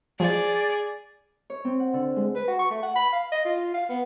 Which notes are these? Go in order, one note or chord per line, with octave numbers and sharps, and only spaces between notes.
F3 G#4 D5
C#5
C4
F#5
D3
G#3
B4
F#4
C#6
A3
F#5
B5
F5
D#5
F4
F5
B3